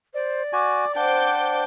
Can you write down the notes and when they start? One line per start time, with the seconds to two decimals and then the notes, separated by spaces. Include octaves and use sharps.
0.14 C5 D5
0.53 F#4 G#5 D6
0.96 D4 C5 F#5 G5 D6 G6